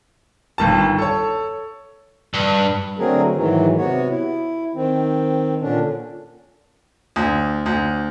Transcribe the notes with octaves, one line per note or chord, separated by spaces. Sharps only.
G1 D#3 A5
A4 C#5
G2
D3 F#3 A3 C4 G#4 A#4
G#2 D#3 E3 F#3
C3 B3 F#4 C#5
E4
D#3 C4
A#2 D3 C#4 D4
D2
D2